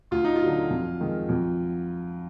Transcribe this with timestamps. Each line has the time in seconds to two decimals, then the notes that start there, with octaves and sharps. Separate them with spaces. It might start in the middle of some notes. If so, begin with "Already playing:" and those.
0.11 D2 F4
0.24 D#4
0.36 F#3 F4
0.46 D3
0.70 F2
1.00 D#3 G#3
1.29 F2